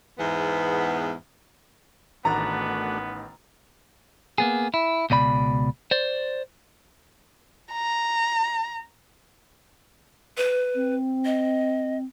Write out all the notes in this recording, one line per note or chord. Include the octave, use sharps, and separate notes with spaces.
E2 G#2 B3
A1 D#3 A3 B3 D4 F#4 A#5 A6
A#3 B3 G#4
E4
C#2 B2 D5 B5
C5 D5
A#5
B4
C4
D#5